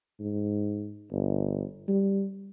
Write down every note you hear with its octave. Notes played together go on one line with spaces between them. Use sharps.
G#2
G1
G3